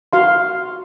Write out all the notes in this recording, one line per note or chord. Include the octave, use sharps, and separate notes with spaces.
F#4 F5 C6